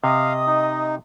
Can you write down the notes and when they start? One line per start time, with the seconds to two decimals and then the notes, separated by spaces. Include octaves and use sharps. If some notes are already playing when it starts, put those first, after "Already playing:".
0.04 C3 D#5 F5 D#6
0.47 D#4